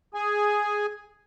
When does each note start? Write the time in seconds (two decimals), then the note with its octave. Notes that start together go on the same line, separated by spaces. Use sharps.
0.14 G#4 G#5